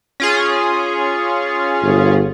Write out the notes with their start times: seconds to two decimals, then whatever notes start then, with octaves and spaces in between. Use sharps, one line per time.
0.20 C#4 F4 G#4
1.83 G1